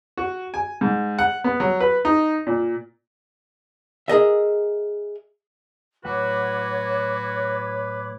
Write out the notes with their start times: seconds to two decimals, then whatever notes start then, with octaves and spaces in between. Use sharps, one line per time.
0.17 F#4
0.54 G#5
0.81 G#2
1.19 F#5
1.44 B3
1.60 F#3
1.80 B4
2.05 D#4
2.47 A#2
4.08 G#4 A#4 D#5 E5
6.05 A2 F#3 F#4 B4 C#5 F#5 D6